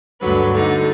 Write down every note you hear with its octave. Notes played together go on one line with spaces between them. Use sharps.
D2 G2 D3 F#3 B4
D3 D#4